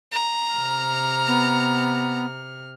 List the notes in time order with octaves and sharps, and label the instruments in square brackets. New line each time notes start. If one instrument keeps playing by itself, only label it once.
[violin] A#5
[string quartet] C3 F6
[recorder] B3